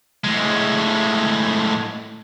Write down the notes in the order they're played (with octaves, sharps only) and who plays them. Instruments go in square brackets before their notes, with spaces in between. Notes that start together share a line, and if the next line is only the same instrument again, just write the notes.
[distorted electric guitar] A2 G#3